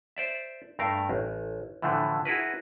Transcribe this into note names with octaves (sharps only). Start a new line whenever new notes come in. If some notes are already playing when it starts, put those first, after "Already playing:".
C5 D5 E5
G2 A3 A#4 F5
A1
A2 D3 E3 F3 A3
E4 F#4 G#4 A#4 B4